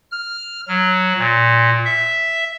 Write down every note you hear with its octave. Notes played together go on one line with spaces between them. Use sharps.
F6
F#3
A#2
E5